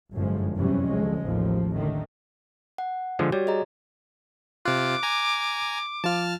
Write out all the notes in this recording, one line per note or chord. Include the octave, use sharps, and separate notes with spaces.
G1 F#2 A2 F3 G#3
E2 C3 E3 F#3 G3 C#4
D2 F3 G#3
A1 D#2 F3
D3 D#3 A3
F#5
D3 F3 G#3
G3 F#4 C#5 G#6
G#4 D#5 A#5
C3 F4 D6 F#6
G#5 A#5
F3 F4 A5 F6